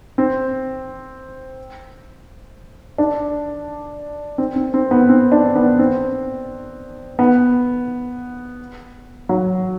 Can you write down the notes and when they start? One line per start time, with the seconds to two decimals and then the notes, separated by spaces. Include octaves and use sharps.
0.18 C4
2.98 D4
4.38 C4
4.56 C4
4.74 C4
4.91 B3
5.09 C4
5.32 D4
5.55 B3
5.79 C4
7.19 B3
9.29 F#3